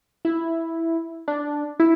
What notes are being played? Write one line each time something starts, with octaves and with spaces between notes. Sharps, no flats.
E4
D4
E4